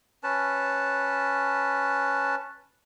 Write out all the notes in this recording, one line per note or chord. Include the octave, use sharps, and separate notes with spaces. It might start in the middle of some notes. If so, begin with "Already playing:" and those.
C#4 B4 A5